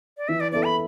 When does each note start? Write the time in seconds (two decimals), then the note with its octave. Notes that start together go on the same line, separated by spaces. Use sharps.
0.17 D5
0.28 E3 E5
0.40 D5
0.51 B3 E4 A4 D5
0.64 B5